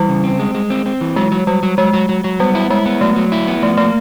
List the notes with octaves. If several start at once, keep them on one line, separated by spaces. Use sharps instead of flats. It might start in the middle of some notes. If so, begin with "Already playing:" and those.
Already playing: E3 G3
C#3
C4
G#3
G#3
C4
C4
E3
F#3 G#3
F#3
F#3 G3
F#3
F#3 G#3
F#3
F#3
F#3
G3 B3
E4
G#3 E4
B3
F#3 A3
F#3
E4
B3
F3 A3
A3 A#3